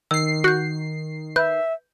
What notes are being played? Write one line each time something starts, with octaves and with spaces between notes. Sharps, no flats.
D#3 E6 C7
F#4 F#6 G6
B4 E5 G6